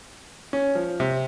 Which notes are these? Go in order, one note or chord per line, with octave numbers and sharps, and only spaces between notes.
C#4
F3
C3